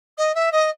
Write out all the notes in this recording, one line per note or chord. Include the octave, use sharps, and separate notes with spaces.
D#5
E5
D#5